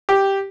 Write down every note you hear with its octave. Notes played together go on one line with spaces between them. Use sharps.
G4